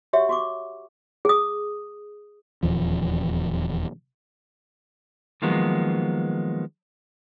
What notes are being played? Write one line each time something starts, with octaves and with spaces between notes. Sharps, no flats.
F#4 G4 C#5 E5 F#5 C#6
F#4 C#6 D6
G#4 D#6
D#1 E2 F3
D#3 F3 F#3 G#3 A#3 B3